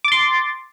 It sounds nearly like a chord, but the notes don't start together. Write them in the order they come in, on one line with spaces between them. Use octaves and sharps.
D6 A6 C6